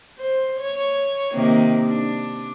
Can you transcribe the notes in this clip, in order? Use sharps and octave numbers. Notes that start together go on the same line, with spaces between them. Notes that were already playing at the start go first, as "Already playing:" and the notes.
C5
C#5
C3 D#3 A#3
D4